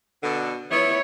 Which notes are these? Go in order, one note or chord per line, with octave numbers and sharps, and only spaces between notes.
B2 D3
B3 E4 C#5